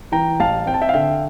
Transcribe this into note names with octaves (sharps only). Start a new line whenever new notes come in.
E3 G5 A#5
A1 F5 A5
C4 G5
A5
E5 G5
F5
D3 E5 G5